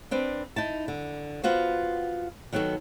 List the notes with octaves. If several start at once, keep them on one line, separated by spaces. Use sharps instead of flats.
C4 D4 B4
D#4 E4 A5
D3
B3 F4 F#4 C5
D#3 F#3 B3 F#4 A4